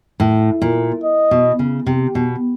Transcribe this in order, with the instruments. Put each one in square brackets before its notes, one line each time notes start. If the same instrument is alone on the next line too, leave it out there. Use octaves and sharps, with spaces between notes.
[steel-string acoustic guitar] A2
A#2
[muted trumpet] D#5
[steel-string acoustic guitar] B2
C#3
C3
B2